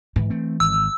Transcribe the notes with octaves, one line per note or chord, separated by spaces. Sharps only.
G#2 E3
A3 C4
G#1 E6